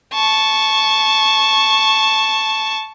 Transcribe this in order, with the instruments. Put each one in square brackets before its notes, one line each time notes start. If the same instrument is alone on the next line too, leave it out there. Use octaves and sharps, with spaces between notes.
[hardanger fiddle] A5 C#6